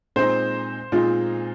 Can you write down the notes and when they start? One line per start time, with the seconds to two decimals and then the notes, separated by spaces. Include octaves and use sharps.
0.16 A#2 G#3 C4 D#4 C5
0.92 A#2 G#3 C4 D#4 F4